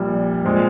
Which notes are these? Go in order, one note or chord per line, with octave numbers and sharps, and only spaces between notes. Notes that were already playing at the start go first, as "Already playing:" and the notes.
Already playing: A#1 A#2 G3
A#2 G#3 C4